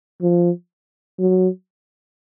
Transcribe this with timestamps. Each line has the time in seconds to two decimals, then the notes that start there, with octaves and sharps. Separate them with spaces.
0.22 F3
1.19 F#3